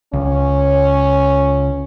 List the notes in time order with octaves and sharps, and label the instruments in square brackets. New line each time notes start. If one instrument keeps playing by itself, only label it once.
[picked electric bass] C#2 [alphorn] C#4